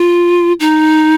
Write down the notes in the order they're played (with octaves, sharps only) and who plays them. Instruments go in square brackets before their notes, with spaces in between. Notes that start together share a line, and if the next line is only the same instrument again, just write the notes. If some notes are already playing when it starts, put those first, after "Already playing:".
Already playing: [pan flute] F4
D#4